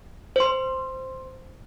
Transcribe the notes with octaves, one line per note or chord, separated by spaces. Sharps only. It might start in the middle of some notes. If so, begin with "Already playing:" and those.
C5 C6